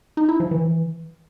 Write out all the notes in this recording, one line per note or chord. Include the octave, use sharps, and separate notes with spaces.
D#4
E4
F3
E3